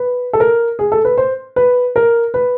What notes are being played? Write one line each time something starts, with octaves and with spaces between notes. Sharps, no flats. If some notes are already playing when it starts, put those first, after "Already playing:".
Already playing: B4
A4
A#4
G#4
A4
B4
C5
B4
A#4
B4